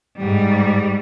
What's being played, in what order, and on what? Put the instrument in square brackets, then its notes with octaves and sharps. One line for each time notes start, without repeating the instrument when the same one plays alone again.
[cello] G#2 G3